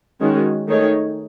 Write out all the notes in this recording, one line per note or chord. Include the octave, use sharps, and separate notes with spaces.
D#3 G#3 C#4 F#4
D#3 A3 D#4 G#4 C#5